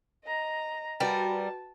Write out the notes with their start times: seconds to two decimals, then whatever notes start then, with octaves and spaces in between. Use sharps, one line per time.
0.24 D#5 A#5
1.00 G3 F#4 A#4 B4 G5 A5